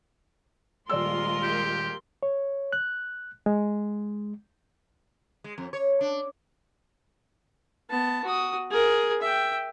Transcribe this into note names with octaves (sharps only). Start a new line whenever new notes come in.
D#1 G#3 F4 A#4 D5 C6 E6
G4
C#5
F#6
G#3
G#3
F2
C#5
D4
B3 A5
F#4 D#6
G#4 A#4
E5 G5